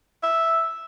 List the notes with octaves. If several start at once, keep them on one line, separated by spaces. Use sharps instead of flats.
E5